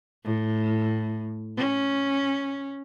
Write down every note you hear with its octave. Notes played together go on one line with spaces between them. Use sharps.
A2
C#4